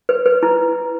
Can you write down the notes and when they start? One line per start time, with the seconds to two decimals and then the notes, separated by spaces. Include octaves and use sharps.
0.09 B4
0.26 B4
0.43 E4